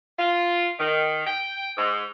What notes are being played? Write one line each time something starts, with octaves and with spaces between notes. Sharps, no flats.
F4
D#3
G5
G#2